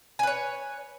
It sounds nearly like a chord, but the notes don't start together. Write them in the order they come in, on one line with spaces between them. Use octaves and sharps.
G#5 B4 C#5